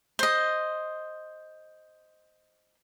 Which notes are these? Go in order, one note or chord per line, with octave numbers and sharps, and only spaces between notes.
C5 D#5